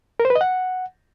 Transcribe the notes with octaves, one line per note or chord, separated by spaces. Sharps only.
A#4
C5
B4
D#5
F#5